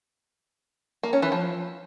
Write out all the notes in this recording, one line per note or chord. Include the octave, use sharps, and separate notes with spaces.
A#3
C#4
E3
F3